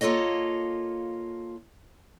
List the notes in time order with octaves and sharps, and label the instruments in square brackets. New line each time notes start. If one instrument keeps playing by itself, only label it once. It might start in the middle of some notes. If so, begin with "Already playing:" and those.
[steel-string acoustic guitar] A#3 F4 A4 C#5 D#5